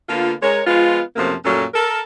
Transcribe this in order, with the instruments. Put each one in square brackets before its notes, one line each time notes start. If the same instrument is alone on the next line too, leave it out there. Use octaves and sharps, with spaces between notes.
[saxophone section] D3 A#3 B3 F4
G#3 A#4 C#5
F3 G#3 B3 F4
F#2 C3 F3 F#3 A3 A#3
F#2 A#2 F#3 G3 A3 A4
A4 A#4